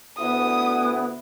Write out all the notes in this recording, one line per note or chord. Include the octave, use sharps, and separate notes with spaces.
D2 B3 E4 D#6